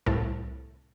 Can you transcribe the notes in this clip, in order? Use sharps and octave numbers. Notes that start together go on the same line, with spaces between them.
C2 A2 A4